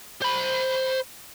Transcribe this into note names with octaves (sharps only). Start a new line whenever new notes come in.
C5 B5